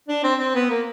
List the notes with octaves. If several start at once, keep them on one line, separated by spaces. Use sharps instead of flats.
D4
C4
C4
B3
A#3